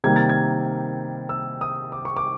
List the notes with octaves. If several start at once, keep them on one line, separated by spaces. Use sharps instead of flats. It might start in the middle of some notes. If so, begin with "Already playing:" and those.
C3 D#3 G3 A#3 G#6
A6
G#6
E6
D#6
D6
C#6
D6